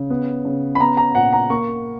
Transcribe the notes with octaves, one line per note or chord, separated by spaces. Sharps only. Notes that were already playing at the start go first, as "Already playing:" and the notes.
Already playing: C#3
B3
C#3
B5
B3 A#5
A#5
A#2 F#5
A#5
A#3 C#6